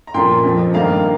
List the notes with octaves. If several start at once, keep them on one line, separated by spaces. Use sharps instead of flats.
A#5
A#2 F3 A#3 G5 C6
F2 F3 C4
G2 D#3 A#3 F5 A#5